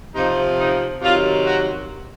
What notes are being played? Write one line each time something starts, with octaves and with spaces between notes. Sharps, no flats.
C3 F3 D#4
D#4
C3 D#3 F#3 F4
F#4